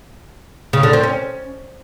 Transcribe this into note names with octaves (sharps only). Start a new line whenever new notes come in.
C#3
D3
C4
C#4